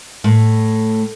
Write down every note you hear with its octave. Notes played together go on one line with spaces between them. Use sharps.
A2